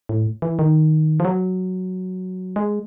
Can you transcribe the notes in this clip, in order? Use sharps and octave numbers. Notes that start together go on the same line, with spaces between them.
A2
E3
D#3
F3
F#3
G#3